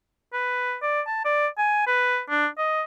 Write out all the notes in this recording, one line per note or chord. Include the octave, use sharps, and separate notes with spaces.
B4
D5
A5
D5
G#5
B4
D4
D#5